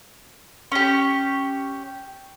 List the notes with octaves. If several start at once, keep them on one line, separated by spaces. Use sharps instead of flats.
C#4 G4